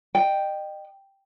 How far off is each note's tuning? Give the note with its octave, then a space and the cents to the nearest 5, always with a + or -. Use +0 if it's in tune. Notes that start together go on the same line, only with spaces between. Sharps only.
D#5 -35 G5 +0